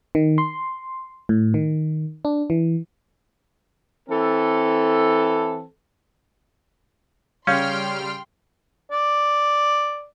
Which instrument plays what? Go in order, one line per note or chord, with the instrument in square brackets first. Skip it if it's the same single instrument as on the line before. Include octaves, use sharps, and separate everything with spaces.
[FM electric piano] D#3
C6
A2
D#3
D4
E3
[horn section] E3 C4 A4
[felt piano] C#3 F5 G6 [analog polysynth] G3 F6 [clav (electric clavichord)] C#4 [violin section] G5 C6
[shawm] D5